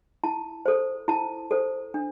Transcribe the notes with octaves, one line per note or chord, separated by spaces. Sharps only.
E4 A5
A4 C5
E4 A5
A4 C5
D4